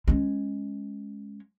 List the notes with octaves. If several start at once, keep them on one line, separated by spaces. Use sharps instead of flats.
G#3 C#4